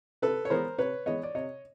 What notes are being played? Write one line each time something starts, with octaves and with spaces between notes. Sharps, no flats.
C3 A4 B4
C#5
E3 G#3 B3 A#4 C5
C3 B4 C#5
E3 G#3 B3 C#5 D#5
D5
C3 C#5 D#5